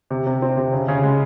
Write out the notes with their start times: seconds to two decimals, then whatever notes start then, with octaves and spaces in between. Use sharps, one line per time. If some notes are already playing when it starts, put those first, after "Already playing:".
0.11 C3
0.27 C3
0.42 C4
0.57 C3
0.73 C#3
0.88 C#3
1.03 G#3